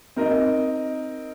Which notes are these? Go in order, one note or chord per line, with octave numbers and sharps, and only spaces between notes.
C4 D#4 A#4 D#5